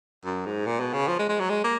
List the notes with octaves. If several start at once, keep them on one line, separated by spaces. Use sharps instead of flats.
F#2
G#2
A#2
B2
C#3
F3
G#3
G#3
F#3
G#3
A#3